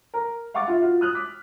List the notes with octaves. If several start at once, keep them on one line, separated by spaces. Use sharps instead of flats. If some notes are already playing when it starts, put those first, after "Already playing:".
A#4
F5 F#5 C#6 D6 A6
F4 E5
F4 F#4
D#6 F6 F#6
D6 B6